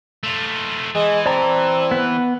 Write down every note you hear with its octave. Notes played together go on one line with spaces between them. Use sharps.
A3 F4
E3 G#3
C4 D5 A5 A#5
B3 B4